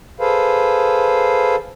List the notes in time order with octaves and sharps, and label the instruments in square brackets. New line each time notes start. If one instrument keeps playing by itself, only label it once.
[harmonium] G#4 A4 B4 C5 F5